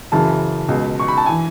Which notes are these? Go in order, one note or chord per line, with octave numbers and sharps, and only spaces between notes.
F#2 C#3 E3 A5
C#2 B2
C#6
B5
A5
E3 G#5